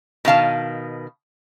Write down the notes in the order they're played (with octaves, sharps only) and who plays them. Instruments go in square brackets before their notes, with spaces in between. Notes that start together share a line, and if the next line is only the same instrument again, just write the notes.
[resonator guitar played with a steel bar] B2 D#3 F5 A5